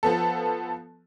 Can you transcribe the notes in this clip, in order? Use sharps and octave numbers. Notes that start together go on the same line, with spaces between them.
F3 B3 A4